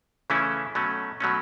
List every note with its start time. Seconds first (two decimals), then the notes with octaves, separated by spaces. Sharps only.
0.30 C#3 E3 A3 C#4 E4
0.75 B2 F#3 A3 C#4
1.20 B2 F#3 A3 C#4